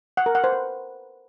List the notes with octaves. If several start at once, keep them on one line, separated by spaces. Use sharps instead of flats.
F#5
A#4
F#5
C5
B4